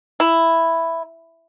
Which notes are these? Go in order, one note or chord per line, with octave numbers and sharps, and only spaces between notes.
E4